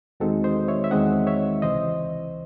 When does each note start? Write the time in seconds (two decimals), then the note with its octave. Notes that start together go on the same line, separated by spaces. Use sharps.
0.20 E2 D#3 G#3 C4 D#4 F#4 A4
0.44 C5 D#5
0.68 C#5 E5
0.84 E5
0.91 E2 D#3 G#3 C4 D#4 D#5 F#5
1.27 C#5 E5
1.62 C#2 C3 E3 C5 D#5